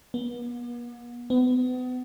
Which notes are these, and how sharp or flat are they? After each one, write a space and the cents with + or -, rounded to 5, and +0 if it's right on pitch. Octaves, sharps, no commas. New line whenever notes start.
B3 -45
B3 +35